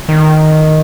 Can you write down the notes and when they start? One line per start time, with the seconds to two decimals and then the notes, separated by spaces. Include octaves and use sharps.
0.09 D#3